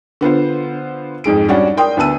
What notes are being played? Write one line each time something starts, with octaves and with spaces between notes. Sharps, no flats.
D3 B3 F4 C5
F2 G#2 G#3 D7
G3 C#4 D4 F#4
A#4 D5 G5 C6 D#6
D2 B3 B4 A5 E6 D#7